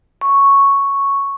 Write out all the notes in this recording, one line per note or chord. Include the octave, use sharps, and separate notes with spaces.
C#6